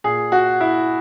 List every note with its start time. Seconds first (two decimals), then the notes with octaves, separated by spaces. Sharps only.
0.04 A#2 G#4
0.32 F#4
0.60 E4